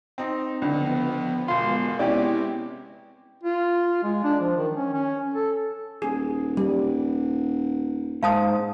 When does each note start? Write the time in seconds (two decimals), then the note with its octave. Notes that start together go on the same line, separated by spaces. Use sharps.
0.18 C4 D#4
0.62 C#2 D3 F3 B3
1.48 E1 G#3 B3 F4 C6
1.99 C3 C#4 E4 G4 D5
3.44 F4
4.04 G#3
4.24 D4
4.40 F3
4.57 D#3
4.76 C#4
4.93 C#4
5.34 A4
6.02 D#1 G#4
6.57 G3
8.23 G#2 F5 A5 D#6